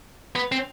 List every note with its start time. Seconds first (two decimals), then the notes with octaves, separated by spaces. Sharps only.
0.36 B3
0.52 C4